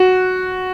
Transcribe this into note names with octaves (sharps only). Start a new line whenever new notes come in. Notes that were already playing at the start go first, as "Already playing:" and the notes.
Already playing: F#4